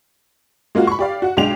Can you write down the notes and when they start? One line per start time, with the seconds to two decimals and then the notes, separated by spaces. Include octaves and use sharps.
0.75 G#3 A#3 F4 F#4
0.87 B5 C#6
0.99 G4 D5 F5
1.22 F#4 F#5
1.37 B1 G#3 D4 G5 F7